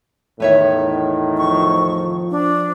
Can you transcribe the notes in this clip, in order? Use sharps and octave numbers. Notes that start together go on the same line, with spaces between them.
E2 A2 D#3 B4 C#5 E5
F3 C#6
D4